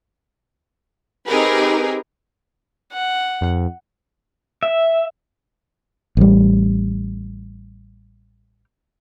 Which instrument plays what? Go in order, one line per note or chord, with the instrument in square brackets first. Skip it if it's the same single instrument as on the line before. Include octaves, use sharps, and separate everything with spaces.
[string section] C4 D#4 G4 G#4 A#4 B4
[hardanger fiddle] F#5
[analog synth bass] F2
[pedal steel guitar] E5
[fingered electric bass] A1 G3